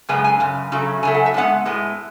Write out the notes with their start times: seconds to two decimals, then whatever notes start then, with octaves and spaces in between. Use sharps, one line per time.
0.09 F#2 C#3 G#3 B3 G#5
0.24 G#5
0.40 F#2 C#3
0.72 C#3 F#3 A3
1.03 C#3 F#3 A3 G#5
1.14 F#5
1.26 E5
1.34 A2 G#3 B3 F#5
1.65 A2 G#3 B3